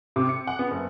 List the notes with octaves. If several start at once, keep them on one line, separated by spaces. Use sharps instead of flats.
C3
C#7
F#5
B3
F#1